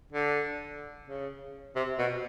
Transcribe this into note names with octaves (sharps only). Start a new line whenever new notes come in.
D3
C#3
C3
B2